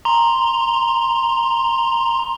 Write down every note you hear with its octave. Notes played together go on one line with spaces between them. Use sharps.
A#5 C6